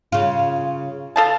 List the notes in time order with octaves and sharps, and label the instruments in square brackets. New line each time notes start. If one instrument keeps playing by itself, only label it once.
[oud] C#3 F4
[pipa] A4 F5 A5